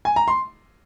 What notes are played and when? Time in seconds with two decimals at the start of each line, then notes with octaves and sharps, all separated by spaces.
0.05 G#5
0.16 A#5
0.28 C6